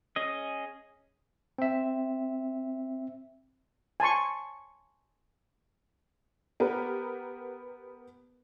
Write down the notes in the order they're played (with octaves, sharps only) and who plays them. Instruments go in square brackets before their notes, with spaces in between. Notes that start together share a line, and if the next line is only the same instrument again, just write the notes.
[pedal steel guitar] C#4 G#4 D#5
[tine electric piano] C4 E5
[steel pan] G#5 A5 C6 C#6
[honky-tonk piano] B3 G4 A#4 B4